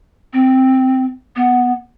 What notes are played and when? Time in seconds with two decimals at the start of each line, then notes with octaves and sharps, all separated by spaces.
0.33 C4
1.36 B3